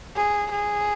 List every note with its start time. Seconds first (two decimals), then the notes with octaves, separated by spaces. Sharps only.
0.16 G#4
0.51 G#4